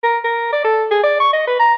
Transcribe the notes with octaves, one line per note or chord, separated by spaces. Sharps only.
A#4
A#4
D5
A4
G#4
D5
C#6
D#5
B4
A#5